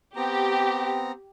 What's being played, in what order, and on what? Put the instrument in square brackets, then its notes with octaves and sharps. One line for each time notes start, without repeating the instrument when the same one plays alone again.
[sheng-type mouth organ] B3 C4 A#5 [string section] G4